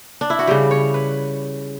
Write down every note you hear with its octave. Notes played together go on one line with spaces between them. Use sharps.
D4
E4
F#4
C#3 G3 G4
C#5
B4